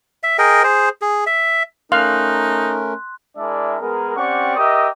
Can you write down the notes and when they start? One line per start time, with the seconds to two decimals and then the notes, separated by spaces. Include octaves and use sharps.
0.23 E5
0.38 G#4 A#4 D#5 G5
0.63 G#4 C5
1.02 G#4
1.27 E5
1.92 A3 C#4 D#4 A#4 F5 C6 F#6
3.37 G#3 D4 E4 A#4 D5 E5
3.81 G#3 B3 G#4 A#4
4.16 C4 C#4 G4 D5 F#5 C#6
4.56 G4 A#4 D#5 E5 D#6